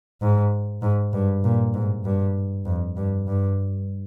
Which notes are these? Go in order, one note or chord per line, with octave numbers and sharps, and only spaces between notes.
G#2
G#2
G2
A#2
G#2
G2
F2
G2
G2